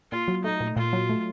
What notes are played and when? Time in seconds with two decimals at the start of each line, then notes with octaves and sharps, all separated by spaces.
0.11 A#2 F4
0.28 F#3
0.44 A3 D#4
0.60 A#2
0.76 A#2 F4
0.93 F#3
1.10 A3